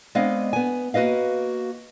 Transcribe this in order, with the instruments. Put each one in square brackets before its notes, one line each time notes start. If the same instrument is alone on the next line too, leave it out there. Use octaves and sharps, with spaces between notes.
[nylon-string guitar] G#3 B3 C4 D4 D#5 F5
B3 G#5
A#3 F#4 B4 D#5 F5